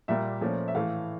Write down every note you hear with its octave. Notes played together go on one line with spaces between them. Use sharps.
A#2 G3 A#3 E5
A#2 F3 A3 C#4
E5
A2 E3 A3 F5